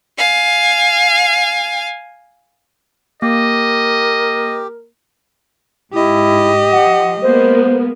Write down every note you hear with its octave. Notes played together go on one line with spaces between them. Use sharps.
F5 G#5
A#3 G4 A#4 D#5
G#2 E4 G4 D#5
F3 F#5
G#3 A#3 B3 C5